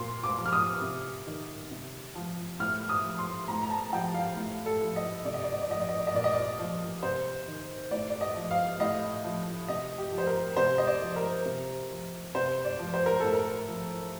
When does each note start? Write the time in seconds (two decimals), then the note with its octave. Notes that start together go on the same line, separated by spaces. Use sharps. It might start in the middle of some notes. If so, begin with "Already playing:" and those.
Already playing: A#2 C6
0.23 D6
0.38 F3
0.46 F6
0.52 D#6
0.82 C3
1.27 D#3
1.71 C3
2.15 F3
2.60 A2 F6
2.89 D#6
3.03 F3
3.19 C6
3.48 A2 A#5
3.63 A#5
3.70 A5
3.92 F3 G5
4.14 F5
4.37 A2
4.66 A4
4.81 F3
4.96 D#5
5.25 C3 D5
5.34 D#5
5.43 D5
5.52 D#5
5.62 D5
5.69 F3 D#5
5.80 D5
5.89 D#5
5.98 D5
6.07 D#5
6.15 A#2 D5
6.24 D#5
6.33 D5
6.59 F3
7.03 C3 C5
7.48 D#3
7.91 A2 D5
8.10 D5
8.21 D#5
8.36 F3
8.51 F5
8.80 A2 D#5
9.24 F3
9.68 C3 D#5
9.98 G4
10.12 F3
10.18 C5
10.27 A#4
10.57 C3 C5
10.78 D#5
10.87 D5
11.02 F3
11.16 A#4
11.46 C3
11.90 F3
12.35 C3 C5
12.64 D5
12.79 F3
12.94 C5
13.06 A#4
13.20 A2 A4
13.33 A#4
13.68 F3